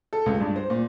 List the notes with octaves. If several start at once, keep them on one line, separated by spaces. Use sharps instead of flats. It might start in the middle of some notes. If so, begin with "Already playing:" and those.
A4
C#2
G2
C5
A#2